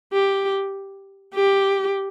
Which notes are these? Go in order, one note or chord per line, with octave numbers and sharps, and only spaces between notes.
G4
G4